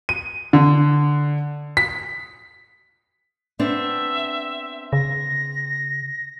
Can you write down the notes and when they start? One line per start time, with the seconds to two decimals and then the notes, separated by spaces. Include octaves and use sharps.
0.09 D#7
0.53 D3
1.77 B6
3.59 B3 C4 D4 E5
4.93 C#3 A#6